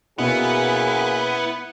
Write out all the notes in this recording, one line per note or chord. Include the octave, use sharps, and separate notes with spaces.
B2 A#3 B3 C#4 E4 G#4 F#6